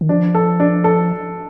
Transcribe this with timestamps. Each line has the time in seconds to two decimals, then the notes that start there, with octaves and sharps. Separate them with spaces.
0.01 D#3
0.09 F3 D4
0.35 A4
0.60 D4
0.84 A4